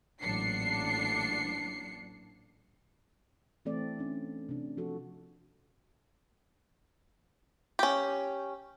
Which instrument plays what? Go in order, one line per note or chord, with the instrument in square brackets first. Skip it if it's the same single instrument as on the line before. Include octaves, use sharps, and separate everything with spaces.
[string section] A1 A#2 F#3 D4 C7 C#7
[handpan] E3 A3 C4 A4 D5
C#4 D4
C3 D4
F3 F#4 A4
[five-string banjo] C#4 G4